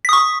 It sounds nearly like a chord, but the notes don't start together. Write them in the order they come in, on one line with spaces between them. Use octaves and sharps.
B6 D#6 C#6